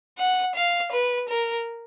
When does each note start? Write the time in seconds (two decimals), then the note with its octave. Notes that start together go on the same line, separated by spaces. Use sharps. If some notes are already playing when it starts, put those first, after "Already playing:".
0.18 F#5
0.55 F5
0.92 B4
1.29 A#4